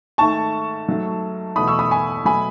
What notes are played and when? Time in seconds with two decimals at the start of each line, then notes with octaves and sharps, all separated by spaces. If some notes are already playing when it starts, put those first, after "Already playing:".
0.18 G#2 D#3 A3 A5 C#6
0.88 G#2 F#3 A3
1.56 E2 B2 A3 B5 D#6
1.67 C#6 E6
1.79 B5 D#6
1.91 G#5 B5
2.25 B2 F#3 A3 G#5 B5